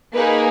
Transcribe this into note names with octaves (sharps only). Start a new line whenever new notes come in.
A#3 D#4 G#4 B4